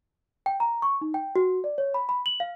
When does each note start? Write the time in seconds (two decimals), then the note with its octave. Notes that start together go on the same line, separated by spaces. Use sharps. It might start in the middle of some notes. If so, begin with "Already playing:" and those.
0.46 G5
0.60 A#5
0.82 C#6
1.01 D#4
1.14 G5
1.36 F#4
1.64 D5
1.78 C#5
1.94 B5
2.09 B5
2.26 F#7
2.40 F5